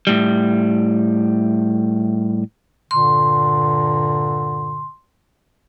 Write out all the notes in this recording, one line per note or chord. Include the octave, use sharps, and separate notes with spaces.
A2 G3
G2 A#2 D3 C6